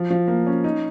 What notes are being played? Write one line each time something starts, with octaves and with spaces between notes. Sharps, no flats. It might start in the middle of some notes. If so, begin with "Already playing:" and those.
Already playing: F3
F3
A#3
C#4
D#4